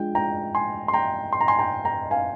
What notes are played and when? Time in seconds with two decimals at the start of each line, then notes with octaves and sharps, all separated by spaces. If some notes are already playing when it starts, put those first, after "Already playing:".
Already playing: F3 G#3 D4 F4 G5
0.15 G5 A#5
0.55 G#5 C6
0.88 C6
0.93 G5 A#5
1.33 C6
1.41 A#5
1.48 G#5 C6
1.59 G5 A#5
1.85 G5 A#5
2.11 F5 G#5